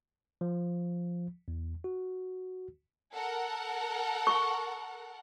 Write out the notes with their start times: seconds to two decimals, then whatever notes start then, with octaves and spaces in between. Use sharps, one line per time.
0.41 F3
1.48 E2
1.84 F#4
3.13 A4 A#4 F#5
4.27 C#6